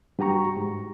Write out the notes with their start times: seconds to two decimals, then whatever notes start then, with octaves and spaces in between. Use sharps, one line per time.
0.19 G2 F#4 G4 A#5 C#6
0.57 G#2